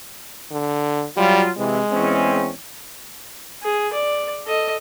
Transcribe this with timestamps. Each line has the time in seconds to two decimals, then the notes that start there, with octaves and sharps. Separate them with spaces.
0.51 D3
1.17 F#3 G3 F4
1.58 C3 E3 G#3
1.92 E2 C4 C#4
3.62 G#4
3.93 D5
4.46 A4 D#5